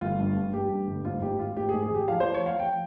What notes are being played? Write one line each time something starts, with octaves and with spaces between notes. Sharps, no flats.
G1 F4
G2
G2
G2 G4
G2
G1
G#2 F4
G#2 G4
G#1 F4
G#2 G4
G#2 G#4
G#4
G#1 G4
F3 F5
F3 C5
C#5
F3 F5
F3 G5